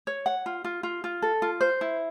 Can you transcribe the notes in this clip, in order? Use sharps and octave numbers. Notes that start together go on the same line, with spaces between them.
C#5
F#5
F4
F4
F4
F4
A4
F4
C5
E4